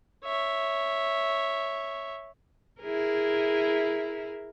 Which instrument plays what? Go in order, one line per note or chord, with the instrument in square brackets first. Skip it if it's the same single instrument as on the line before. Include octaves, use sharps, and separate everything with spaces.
[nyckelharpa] C#5 E5
[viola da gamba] E4 G#4 A#4